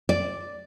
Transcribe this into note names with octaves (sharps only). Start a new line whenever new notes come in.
D5